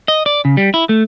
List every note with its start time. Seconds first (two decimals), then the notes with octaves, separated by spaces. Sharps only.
0.08 D#5
0.26 D5
0.45 C#3
0.57 G3
0.74 E4
0.89 A3